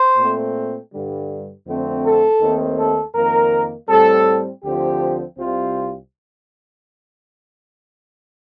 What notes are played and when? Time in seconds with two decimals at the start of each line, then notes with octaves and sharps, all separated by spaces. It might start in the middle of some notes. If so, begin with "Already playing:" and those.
Already playing: C5
0.17 A#2 A3 C4
0.91 G2 D3 G3
1.66 F2 D3 A3 C4
2.03 A4
2.40 D#2 D#3 A3 C4
2.77 A4
3.14 F2 D#3 A#3 A#4
3.88 A2 G3 C4 A4
4.63 D2 D3 F3 C4 G4
5.38 C2 C3 G3 C4 F4